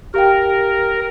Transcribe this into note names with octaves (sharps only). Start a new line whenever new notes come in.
G4 A#4 F5 G5